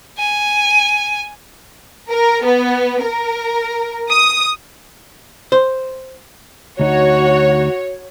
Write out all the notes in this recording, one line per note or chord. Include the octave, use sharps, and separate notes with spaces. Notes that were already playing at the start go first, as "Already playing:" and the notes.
G#5
A#4
B3
A#4
D#6
C5
D2 D#4 F#4 C#5